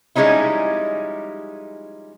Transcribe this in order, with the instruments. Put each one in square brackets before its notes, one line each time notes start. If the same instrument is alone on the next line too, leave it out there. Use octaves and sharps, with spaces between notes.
[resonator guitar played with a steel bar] F3 G3 G#3 C#4 D#4 E4